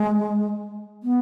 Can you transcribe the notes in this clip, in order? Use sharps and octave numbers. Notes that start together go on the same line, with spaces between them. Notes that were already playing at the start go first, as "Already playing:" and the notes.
Already playing: G#3
B3